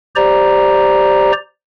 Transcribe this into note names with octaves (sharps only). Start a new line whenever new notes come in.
G4 C5 D5 A#5